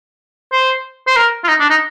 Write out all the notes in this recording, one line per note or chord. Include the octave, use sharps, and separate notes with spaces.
C5
C5
A#4
F4
D#4
D4
D#4